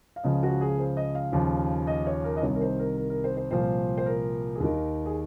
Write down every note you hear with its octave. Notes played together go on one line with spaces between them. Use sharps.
F5
C#2 C#3 F3 D#5
F#4
G#4
C5
D#5
F5
D#2 C#3 F3
D#5
C#5
A#4
D#5
C2 C3 D#3 C#5
A#4
C5
A#4
A#4
A#4
C5
C5
C2 A#2 F3 C5
C5
A#4
G#4
D#2 D#3 A#4
G#4